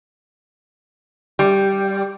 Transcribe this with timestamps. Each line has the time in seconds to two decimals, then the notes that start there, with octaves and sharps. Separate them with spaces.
1.39 G3